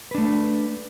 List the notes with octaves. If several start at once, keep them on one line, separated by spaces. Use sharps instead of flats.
A3 D4 B4